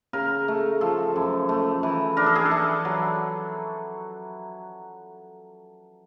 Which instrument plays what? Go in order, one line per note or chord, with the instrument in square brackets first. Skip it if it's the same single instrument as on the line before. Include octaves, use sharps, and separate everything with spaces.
[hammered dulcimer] C#3 A#4
A3
F3 A4
F#2
A3
E3
D4 A#4
A4
G#4
A4
E3
F#3